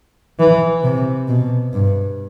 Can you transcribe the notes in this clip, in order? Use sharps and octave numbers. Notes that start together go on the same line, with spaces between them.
E3
C3
B2
G2